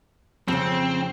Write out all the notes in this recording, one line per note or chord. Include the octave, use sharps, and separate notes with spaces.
F2 C#3 C4